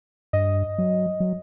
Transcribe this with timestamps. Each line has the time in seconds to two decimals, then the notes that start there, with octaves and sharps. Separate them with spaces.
0.33 G2 D#5
0.78 F#3
1.20 F#3